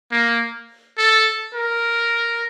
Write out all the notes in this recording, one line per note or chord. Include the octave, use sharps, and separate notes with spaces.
A#3
A4
A#4